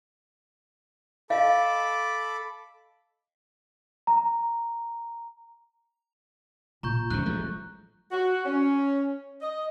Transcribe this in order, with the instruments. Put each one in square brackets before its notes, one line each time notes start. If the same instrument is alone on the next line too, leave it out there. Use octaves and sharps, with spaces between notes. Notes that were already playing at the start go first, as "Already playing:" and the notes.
[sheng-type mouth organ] A4 B5 D6 [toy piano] D#5 F5
[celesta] A#5
[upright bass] A#2 [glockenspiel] A#5 C#6 G6
[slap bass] F#1 C#2 B2 [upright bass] F3 F#3 [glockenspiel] F#6
[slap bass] A1 G#3 A3
[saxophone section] F#4
C#4
D#5